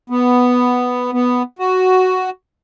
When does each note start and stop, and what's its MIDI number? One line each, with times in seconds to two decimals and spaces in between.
0.10 1.11 59
1.13 1.42 59
1.59 2.30 66